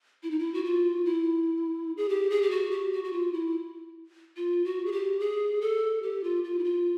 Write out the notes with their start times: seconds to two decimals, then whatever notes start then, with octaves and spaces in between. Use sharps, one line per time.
0.23 E4
0.31 D#4
0.39 E4
0.54 F#4
0.65 F4
1.05 E4
1.97 G#4
2.09 G4
2.30 G#4
2.42 G4
2.51 F#4
2.71 G4
2.92 F#4
3.04 F#4
3.13 F4
3.33 E4
4.36 F4
4.65 F#4
4.86 G#4
4.92 G4
5.20 G#4
5.61 A4
6.02 G4
6.24 F4
6.44 F4
6.59 E4
6.64 F4